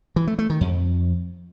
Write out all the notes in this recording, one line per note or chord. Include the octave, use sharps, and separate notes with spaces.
E3
A3
A3
D#3
F2